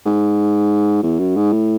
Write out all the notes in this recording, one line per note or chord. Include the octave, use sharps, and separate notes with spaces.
G#2
E2
F#2
G#2
A2